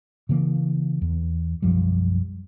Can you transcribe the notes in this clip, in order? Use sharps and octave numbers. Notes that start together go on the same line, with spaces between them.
C#3 E3 A#3
E2
B1 F#2 F3 G3